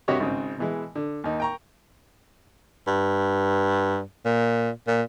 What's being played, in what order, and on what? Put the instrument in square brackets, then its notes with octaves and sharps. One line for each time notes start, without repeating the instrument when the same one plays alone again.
[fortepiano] G2 C3 F#4 G4 C#5 D#5
G#1 C#3 C4
B2 E3 G#3
D3
D#2 D#4
G5 A#5 C#6
[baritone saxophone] G2
A#2
A#2